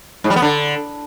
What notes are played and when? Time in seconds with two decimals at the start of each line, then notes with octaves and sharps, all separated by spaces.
0.24 G#2
0.30 G3
0.36 B3
0.42 D3